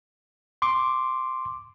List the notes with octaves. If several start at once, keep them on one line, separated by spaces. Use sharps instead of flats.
C6 D6